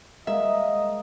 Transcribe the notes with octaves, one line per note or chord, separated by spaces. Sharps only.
G#3 A#3 D#5 E5